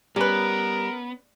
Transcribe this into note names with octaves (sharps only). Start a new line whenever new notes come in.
G3 B3 C#4 A#4 B4